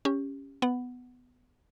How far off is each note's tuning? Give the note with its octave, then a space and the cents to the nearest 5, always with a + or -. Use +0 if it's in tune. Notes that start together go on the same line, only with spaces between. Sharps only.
C#4 +0 G4 +25
B3 +10 F#5 +0